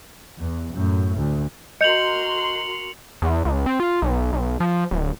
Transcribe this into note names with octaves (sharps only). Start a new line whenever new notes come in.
E2
F#2 A2
D2
F#4 A#4 D#5 C6 G6 C#7 F7 F#7
E2
C#2
C4
F4
B1
B1
F3
D1